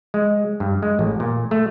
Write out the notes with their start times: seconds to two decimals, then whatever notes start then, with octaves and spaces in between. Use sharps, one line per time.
0.14 G#3
0.60 G2
0.83 G#3
0.99 A1
1.20 A#2
1.51 A3